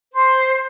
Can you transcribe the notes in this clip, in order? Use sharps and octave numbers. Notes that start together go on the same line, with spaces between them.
C5